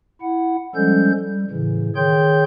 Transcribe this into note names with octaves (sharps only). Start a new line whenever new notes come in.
E4 F#5
F3 G3 G#3 C#4 A4 G6
G3
A2 C#3 E3
D#3 G#4 C#5 G5 C6 G6